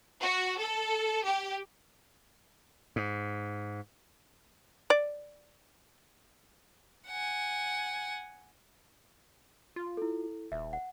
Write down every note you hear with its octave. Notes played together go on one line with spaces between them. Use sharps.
F#4
A4
G4
G#2
D5
F#5 G#5
F4
E4 A4
D#1 E5
F#5